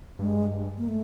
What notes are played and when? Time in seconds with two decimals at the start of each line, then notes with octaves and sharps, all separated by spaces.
0.19 G2 G#3
0.78 A#3
0.88 A3